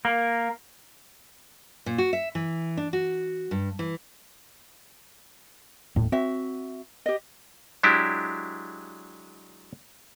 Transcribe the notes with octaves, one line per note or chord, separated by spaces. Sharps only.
A#3
A#2
F#4
E5
E3
D4
F#4
G2
E3
D#1 A2
C4 F#4 E5
G4 D#5
F#3 G#3 D4 E4 G4